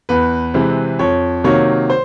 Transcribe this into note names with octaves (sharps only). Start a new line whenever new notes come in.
E2 B4
C3 E3 G#3 C4
F2 C#5
C3 D#3 F#3 A#3 C#5
C5